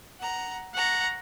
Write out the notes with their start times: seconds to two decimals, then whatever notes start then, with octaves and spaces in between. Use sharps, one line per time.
0.20 F#5 A#5
0.75 F#5 A#5 C#6